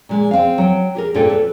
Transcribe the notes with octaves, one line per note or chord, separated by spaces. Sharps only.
A#2 G#3
C4 G#4 F5
F#3 G5
G4 G#4 A#4
G2 A#2 C4 G#4 A4 G5
A4 B4